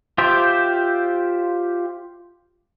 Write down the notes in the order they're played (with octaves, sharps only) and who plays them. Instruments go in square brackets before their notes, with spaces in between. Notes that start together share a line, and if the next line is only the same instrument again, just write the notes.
[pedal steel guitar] F4 G4 C5 E5 G5